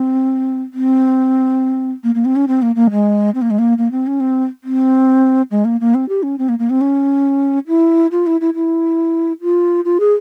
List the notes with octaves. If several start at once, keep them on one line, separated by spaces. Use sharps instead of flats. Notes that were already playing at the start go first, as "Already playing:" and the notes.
Already playing: C4
C4
A#3
A#3
C4
C#4
C4
A#3
A#3
G#3
C4
A#3
G#3
A#3
A#3
C4
C#4
C4
C4
G#3
A#3
A#3
C4
G4
C#4
C4
A#3
A#3
C4
C#4
E4
F4
E4
E4
E4
F4
F4
G#4